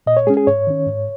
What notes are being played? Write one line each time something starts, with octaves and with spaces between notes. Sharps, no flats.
A#2 D#5
C#5
G#3 C#4 G#4
G#4
G#2 C#5
D#3 C#4
G#2